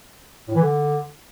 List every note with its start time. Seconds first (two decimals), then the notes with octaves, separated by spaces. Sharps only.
0.48 A2
0.55 E3
0.62 D3